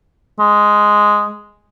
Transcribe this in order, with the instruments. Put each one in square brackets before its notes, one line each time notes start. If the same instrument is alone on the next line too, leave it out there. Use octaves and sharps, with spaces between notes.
[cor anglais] G#3